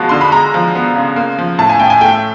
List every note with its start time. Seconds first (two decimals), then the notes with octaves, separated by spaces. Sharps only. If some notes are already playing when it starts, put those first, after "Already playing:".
Already playing: B2 F3 G#3 B3 A5
0.09 D3 C6
0.21 B5
0.32 G#3 A#5
0.54 F3
0.75 B3
0.96 C#3
1.16 A#3
1.38 F3
1.58 A2 A5
1.70 G#5
1.79 A2 G5
1.90 G#5
2.01 A3 G5